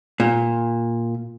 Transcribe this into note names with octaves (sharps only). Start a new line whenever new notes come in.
A#2